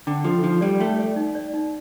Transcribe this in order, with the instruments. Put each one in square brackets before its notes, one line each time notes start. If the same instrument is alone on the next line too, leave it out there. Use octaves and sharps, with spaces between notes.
[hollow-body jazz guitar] D3 [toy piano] G5
[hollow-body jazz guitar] F3 [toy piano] A4
[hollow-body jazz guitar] F3 [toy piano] D#4
[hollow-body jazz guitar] G3 [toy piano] D5
[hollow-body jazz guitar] A3 [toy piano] G5
[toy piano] D5
D#4
D5
D#4